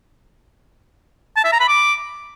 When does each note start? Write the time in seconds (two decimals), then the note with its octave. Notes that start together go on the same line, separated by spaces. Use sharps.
1.37 A5
1.45 E5
1.53 A#5
1.61 B5
1.68 D6